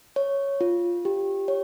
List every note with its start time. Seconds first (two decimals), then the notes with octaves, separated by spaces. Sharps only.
0.16 C#5
0.61 F4
1.05 G4
1.48 C#5